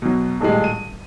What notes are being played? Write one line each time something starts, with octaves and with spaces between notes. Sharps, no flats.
B2 F#3
D#1 A2 G3 G#3
D#7